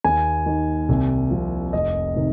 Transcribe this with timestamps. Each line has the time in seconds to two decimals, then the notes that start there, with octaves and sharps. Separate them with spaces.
0.04 D#2 G#5
0.46 D#3
0.89 C2
1.31 C3 F3
1.73 F1 D#5
2.16 C3 D#3